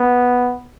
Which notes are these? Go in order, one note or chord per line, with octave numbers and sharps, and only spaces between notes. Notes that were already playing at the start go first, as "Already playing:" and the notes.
Already playing: B3